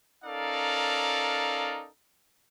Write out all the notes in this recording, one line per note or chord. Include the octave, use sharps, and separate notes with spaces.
C#4 D#4 A4 A#4 D5 F5